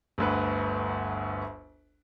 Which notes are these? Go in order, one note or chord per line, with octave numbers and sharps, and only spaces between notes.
G1 D2 B4